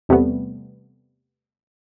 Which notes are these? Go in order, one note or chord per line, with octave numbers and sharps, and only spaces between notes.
E2 C3 G3 A3 B3